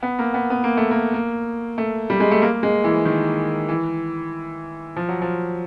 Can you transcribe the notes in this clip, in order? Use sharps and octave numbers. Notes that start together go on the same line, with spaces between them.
B3
A#3
B3
B3
A#3
A3
A#3
A#3
A3
G3
G#3
A3
A#3
G#3
E3
D#3
E3
F3
F#3
F3